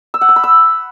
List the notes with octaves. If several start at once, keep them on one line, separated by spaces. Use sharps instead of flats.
E6
F#5
E6
B5
E6